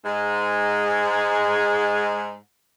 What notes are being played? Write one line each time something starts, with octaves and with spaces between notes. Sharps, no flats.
G#2 G#3